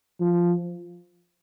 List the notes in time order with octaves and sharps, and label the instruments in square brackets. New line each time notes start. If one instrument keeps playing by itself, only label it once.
[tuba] F3